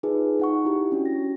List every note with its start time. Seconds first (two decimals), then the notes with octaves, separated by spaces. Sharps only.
0.03 D#4 F4 G#4 B4
0.40 D#4 F#5 C#6
0.65 E4 G4
0.92 C#4 D4 F#4
1.06 A#6